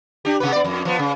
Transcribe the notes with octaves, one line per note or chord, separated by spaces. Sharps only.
D4 G4
C3 B3 B4
B3 D5
F2
F3 B3
C#3